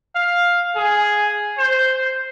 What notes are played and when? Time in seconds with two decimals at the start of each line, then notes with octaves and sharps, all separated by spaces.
0.15 F5
0.76 G#4
1.58 C5